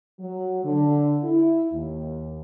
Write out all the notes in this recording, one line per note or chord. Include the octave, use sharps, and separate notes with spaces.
F#3
D3
E4
D#2